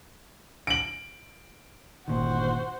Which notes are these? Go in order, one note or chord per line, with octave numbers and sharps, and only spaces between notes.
D7 F#7
G1 A#2 D#3 F#4 C5